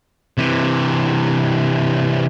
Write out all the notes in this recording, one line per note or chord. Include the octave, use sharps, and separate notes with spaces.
C3 E3